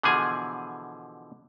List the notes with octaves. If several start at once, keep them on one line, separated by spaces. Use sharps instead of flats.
B2 D3 E3 F3 G#4 G#5